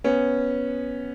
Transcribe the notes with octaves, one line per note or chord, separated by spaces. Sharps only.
B3 C#4